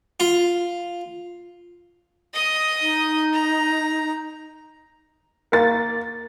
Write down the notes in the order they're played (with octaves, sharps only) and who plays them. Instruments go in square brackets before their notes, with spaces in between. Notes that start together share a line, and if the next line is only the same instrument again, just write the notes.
[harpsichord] F4
[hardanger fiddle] D#5 D#6
[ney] D#4
[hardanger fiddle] A#5
[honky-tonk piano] A#3 A6